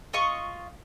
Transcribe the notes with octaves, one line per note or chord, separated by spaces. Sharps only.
F4 D#5 C#6